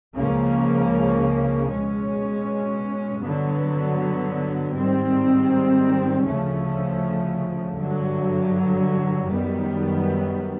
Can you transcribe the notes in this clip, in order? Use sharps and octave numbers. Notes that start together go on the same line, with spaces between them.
C#2 C#3 F3 A#3 C#4
B2 G#3 C#4
G2 D3 F#3 B3
G#2 D#3 G3 C4
D2 C#3 F3 A3 C#4
G2 D3 F#3
F#2 D#3 G3 B3